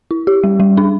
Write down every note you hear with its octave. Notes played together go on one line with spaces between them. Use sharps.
E4
G4
G3
G3
D4